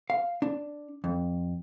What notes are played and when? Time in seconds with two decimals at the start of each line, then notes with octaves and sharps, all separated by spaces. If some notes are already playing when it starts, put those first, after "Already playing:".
0.10 F5
0.42 D4
1.04 F2